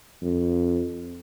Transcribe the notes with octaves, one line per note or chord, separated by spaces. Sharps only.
F2